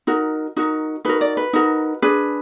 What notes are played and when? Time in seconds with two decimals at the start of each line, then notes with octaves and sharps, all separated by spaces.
0.07 D#4 F#4 A#4
0.56 D#4 F#4 A#4
1.05 D#4 F#4 A#4 B4
1.21 D5
1.37 B4
1.53 D#4 F#4 A#4
2.02 D4 G#4 B4